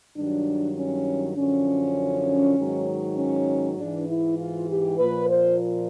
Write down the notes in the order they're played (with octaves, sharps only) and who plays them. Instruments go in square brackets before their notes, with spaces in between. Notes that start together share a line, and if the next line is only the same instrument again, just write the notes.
[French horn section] G2 D#3 F#3 D4
C#4
F#2 D3 F3 C#4
G#2 D#3 F#3
C#4
G#2 E3 D4
E4
F4
G4
A#2 F3 B4
C5